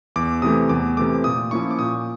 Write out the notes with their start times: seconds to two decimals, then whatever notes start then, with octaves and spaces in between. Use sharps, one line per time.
0.16 E2 D6
0.42 C3 E3 A3 D#6
0.69 E2 D6
0.97 C3 E3 A3 D6
1.24 A#2 D#6
1.51 F3 A#3 C#4 E4 C#6
1.71 D6
1.79 A#2 D#6